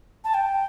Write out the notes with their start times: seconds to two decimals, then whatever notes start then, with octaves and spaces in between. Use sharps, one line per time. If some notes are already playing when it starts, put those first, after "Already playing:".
0.24 A5
0.34 G5